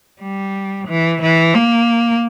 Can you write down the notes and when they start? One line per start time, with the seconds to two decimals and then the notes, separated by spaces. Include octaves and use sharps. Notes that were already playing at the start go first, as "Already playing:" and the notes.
0.21 G3
0.88 E3
1.22 E3
1.54 A#3